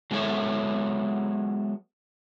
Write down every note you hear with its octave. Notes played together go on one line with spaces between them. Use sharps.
F#3 G#3 B3 A4 C#5 E5